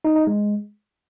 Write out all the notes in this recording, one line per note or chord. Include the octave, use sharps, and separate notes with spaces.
D#4
D#4
G#3